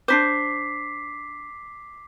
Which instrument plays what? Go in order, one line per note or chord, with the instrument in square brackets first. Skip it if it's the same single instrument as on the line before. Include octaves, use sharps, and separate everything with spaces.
[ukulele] D4 D#4 C5 [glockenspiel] D6 B6 C7